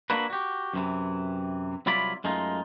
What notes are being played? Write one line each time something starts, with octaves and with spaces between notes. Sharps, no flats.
A#3 D4 E4 F#4 B4
F#4 G4
F#2 C3 E3
C2 F#3 E4 F4 D5 B5
F#2 G#3 A3 D#4 F4